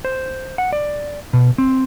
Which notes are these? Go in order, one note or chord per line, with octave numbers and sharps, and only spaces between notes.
C5
F#5
D5
B2
C4